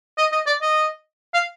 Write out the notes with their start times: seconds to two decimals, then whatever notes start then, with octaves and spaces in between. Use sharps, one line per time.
0.18 D#5
0.32 D#5
0.46 D5
0.62 D#5
1.34 F5